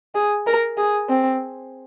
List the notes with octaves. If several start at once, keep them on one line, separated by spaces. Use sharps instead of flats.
G#4
A#4
G#4
C4